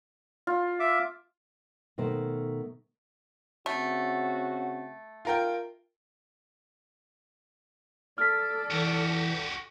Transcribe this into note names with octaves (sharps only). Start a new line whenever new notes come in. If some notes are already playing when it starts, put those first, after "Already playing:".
F4
E5 D6
B2 D#3 A3 C5
C#3 A3 C4 F#4
F4 A#4 G5
A4 D5 F6 B6
E3 F#4 G4